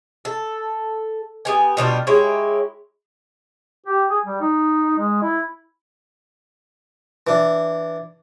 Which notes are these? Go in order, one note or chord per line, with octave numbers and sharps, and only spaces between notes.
A4
B3 G4 G#5
B2 G3 D4 F4
G#3 E4 G4 C#5
G4
G#4
G3
D#4
G#3
E4
E3 D4